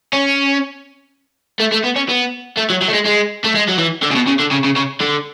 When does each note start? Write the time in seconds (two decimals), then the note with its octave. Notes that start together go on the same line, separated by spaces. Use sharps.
0.13 C#4
1.60 A3
1.72 A3
1.84 B3
1.96 C#4
2.09 B3
2.57 A3
2.70 F#3
2.82 F#3
2.88 A3
2.93 G#3
3.05 G#3
3.44 A3
3.55 G#3
3.69 F#3
3.79 E3
4.03 D3
4.11 C#3
4.16 B2
4.27 C#3
4.40 D3
4.51 C#3
4.64 C#3
4.76 C#3
5.01 D3